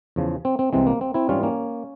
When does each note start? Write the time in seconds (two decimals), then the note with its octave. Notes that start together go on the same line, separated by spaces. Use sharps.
0.16 E2 C#3 F3
0.45 C4
0.59 C4
0.73 C2 C3 E3 G#3 C4
0.87 A#3
1.01 C4
1.14 C4 E4
1.29 G#2 E3 G3 C#4 F4
1.43 A#3 C#4